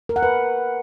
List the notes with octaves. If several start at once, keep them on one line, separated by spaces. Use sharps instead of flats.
A#4
F#5
B4